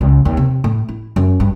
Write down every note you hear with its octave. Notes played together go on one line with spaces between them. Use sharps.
C#2
D#2
C3
A2
E4
F#2
G2